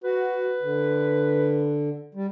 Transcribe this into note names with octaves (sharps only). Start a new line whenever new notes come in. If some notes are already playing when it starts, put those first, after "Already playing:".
F#4 B4
D3
G3